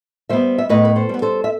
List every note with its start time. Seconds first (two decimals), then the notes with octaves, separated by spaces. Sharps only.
0.29 G3 B3 C5 E5
0.58 E5
0.69 A2 B4 D#5
0.85 B4
0.96 A4 C5
1.09 G3 B3
1.22 A4 C5
1.44 E5